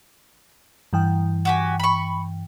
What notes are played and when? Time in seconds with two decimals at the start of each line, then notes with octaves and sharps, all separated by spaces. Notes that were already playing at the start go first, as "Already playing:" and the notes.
0.93 G2 E3 G5
1.45 F#4 G4 G#5
1.80 B5 C#6